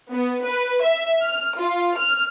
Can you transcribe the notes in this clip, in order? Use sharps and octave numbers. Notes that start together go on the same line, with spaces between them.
B3
B4
E5
F6
F4
F6